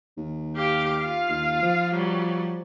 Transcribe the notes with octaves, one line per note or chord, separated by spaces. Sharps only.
D#2
G4 F5 D6
F4 F5
D#2
F3
F#3 G3